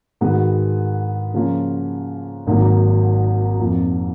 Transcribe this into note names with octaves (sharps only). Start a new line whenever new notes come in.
G#2 D#3 G#3 B3 F#4
C#3 F3 A#3 C#4 F4
G#1 G#2 D#3 F#3 A#3
F2 F3 A#3